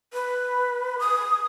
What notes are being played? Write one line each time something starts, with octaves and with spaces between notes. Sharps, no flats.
B4
D#6